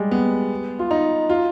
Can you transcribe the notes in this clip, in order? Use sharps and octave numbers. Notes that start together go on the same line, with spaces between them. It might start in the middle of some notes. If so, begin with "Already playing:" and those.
Already playing: G3 G#3
B3
F4
D#4
F4